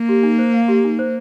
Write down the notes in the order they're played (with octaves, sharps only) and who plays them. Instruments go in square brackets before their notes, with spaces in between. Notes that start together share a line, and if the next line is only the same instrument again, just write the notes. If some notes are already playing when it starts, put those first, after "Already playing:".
Already playing: [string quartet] A#3
[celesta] G4
D#4
C5
F5
G4
D#4
C5